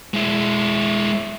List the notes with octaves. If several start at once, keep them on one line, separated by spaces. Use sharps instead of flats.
G#3 E4